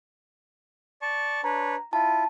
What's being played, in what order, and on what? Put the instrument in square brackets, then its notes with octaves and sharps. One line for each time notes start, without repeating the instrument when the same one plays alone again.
[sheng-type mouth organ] D5 A5 C#6
[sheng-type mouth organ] D4 B4 C#5 [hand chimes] A#5
[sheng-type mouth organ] E4 F4 [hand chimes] A5